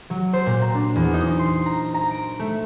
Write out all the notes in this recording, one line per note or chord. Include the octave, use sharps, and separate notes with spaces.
F#3
C5
A#2
A#5
D4
E2
D#4
C6
A#5
A#5
D7
A3